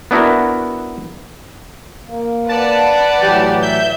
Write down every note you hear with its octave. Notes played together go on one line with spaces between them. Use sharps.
B3 D4 E4 F#4 A#4
A#3
B4 D5 F#5 A5
A2 E3 F#3 G4
E5 G6